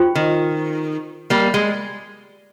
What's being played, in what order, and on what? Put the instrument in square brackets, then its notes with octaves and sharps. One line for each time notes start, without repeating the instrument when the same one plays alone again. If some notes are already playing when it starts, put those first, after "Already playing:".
Already playing: [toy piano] F4 C5 G5 C#6
[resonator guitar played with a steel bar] D#3
G3 A#3
G#3